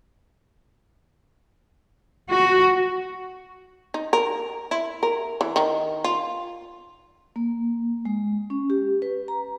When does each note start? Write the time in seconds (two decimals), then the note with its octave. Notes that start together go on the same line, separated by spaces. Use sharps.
2.30 F#4
3.94 D#4
4.13 A#4
4.71 E4
5.03 A#4
5.41 E3
5.56 D#3
6.04 F4
7.36 A#3
8.05 G#3
8.50 C#4
8.70 G4
9.02 B4
9.28 A#5